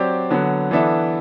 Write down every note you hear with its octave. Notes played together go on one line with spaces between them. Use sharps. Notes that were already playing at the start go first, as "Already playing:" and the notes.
Already playing: F#3 C4 G4 D5
D3 F#3 B3
E3 B3 D4 A4 E5